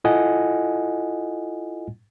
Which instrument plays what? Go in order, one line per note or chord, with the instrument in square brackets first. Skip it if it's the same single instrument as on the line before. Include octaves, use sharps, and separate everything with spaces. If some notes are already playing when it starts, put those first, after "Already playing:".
[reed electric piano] E4 F4 A4 D#5 F#5 G#5